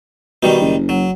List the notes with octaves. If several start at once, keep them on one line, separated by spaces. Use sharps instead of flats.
B2 D#3 G3 D#4
F#1
F#3